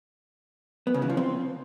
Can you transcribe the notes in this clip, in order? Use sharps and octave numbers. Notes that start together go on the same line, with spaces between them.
B3
C#3
E3
F3
C4